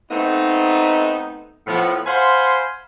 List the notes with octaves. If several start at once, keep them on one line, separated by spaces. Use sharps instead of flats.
A3 B3 C4 D#4
A2 F3 B3
C5 F5 F#5 G#5 B5 C6